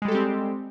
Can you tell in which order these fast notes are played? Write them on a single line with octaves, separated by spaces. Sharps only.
G#3 G3 A4 G4 C4